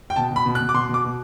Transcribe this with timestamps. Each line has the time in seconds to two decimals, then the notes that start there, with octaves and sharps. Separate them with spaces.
0.10 G5
0.16 B2 A5
0.31 B2
0.36 B5
0.46 B2
0.55 F#6
0.61 B2
0.69 D6
0.74 B2 C6
0.89 B2
0.94 D6
1.04 B2